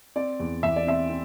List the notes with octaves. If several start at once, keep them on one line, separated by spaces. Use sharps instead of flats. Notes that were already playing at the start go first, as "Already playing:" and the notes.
C4 D5
E2
E2 E5
D5
C4 E5
C4